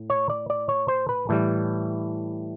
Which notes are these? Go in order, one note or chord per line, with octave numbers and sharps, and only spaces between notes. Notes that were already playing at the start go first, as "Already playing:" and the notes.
Already playing: A2
C#5
D5
D5
C#5
C5
B4
A2 E3 G3